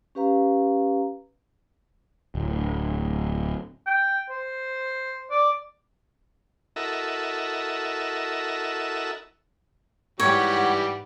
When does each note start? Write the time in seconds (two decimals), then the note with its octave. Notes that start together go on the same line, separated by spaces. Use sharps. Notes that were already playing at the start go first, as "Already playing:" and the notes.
0.15 C#4 G4 B4 F5 A#5
2.35 D1
3.87 G5
4.30 C5
5.31 D5
6.76 E4 F#4 A4 A#4 D#5 E5
10.20 G#2 E3 G3 G4 C#5 F#5